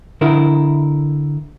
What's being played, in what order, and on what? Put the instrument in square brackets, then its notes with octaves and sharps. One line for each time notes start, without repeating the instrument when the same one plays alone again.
[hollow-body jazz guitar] D3 E4 A#4